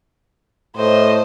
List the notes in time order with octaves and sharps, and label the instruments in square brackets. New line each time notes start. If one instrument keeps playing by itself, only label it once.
[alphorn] A2 [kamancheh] C5 D#5